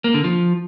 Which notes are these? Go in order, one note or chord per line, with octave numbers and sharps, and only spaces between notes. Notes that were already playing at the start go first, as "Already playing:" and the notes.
A#3
D3
F3